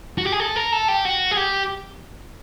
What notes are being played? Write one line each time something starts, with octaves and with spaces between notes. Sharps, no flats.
F#4
G4
G#4
A4
A#4
A4
G4
F#4
G#4
G4